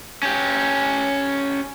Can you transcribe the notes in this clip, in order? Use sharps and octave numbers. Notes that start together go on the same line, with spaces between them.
C#4 G4